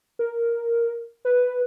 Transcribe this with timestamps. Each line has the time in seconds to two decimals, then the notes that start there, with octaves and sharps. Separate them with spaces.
0.19 A#4
1.25 B4